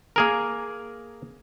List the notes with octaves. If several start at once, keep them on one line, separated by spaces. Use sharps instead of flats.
A#3 G#4 A#4